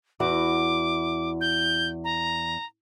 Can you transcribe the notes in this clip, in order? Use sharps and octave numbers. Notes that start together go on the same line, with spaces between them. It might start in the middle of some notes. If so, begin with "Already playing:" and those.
E2 E4 F#4 D6
G6
A#5